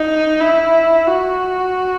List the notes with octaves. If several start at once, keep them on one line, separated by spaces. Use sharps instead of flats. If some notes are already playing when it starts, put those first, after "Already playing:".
Already playing: D#4
E4
F#4